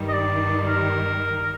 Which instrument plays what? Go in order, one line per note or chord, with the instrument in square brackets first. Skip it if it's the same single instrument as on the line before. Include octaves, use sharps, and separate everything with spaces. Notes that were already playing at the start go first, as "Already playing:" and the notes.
Already playing: [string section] G2 D#3 G3
[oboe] D#5
D5
A#4